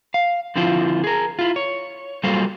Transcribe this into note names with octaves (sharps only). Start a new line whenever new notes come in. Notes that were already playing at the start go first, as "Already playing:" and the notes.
F5
D3 F3 C4 E4 F4
G#4 A#4
E4 F4
C#5
F#3 G3 A#3 F4 A4 C5